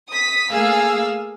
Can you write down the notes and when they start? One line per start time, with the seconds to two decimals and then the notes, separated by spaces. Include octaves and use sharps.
0.11 D#6 B6
0.51 A3 A#3 G#4 F5 E6